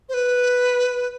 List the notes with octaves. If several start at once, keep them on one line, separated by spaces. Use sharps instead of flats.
C5
B4